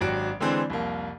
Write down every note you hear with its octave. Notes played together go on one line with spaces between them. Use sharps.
G#1 F#3 D4 F#4 G4 D7
D3 E3 G#3 C4 D4 C5
C2 F2 A#3